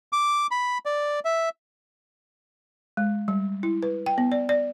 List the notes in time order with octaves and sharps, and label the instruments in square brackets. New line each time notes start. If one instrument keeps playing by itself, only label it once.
[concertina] D6
B5
D5
E5
[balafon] G#3
G3
E4
B4
G5
B3
D5
D5